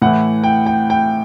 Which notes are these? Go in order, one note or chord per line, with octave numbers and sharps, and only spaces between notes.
A2 E3 F#5
G5
G5
G5